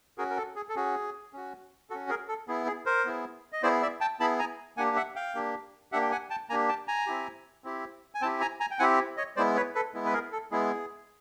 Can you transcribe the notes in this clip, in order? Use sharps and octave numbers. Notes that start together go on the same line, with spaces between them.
C#4 F#4 G#4 A#4
A#4
A4
G#4
A4
C#4 F#4 G#4
C#4 F#4
C#4 F#4 A4
G#4 A#4
A4
B3 E4 G#4
G#4
A#4 C5
B3 E4 G#4
D#5
B3 E4 G#4 C5 D5
D5 E5
G5 A5
B3 E4 G#4 A5 B5
G#5 A#5
A#3 D4 G4 F#5 G#5
E5 F#5
F5 G5
A#3 D4 G4
A#3 D4 G4 E5 F#5
G5
F#5 G#5
G5 A5
A#3 D4 G4 G#5 A#5
G5 A5
G#5 A#5
C4 E4 G4
C4 E4 G4
G#5
C4 E4 G4 G5 A5
G#5 A#5
G#5 A#5
G5
C4 E4 G4 F#5 G#5
C#5 D#5
G#3 B3 E4 C5 D5
B4 C#5
A4 B4
G#3 B3 E4
B4
G#4 A#4
A4
G#3 B3 E4 G#4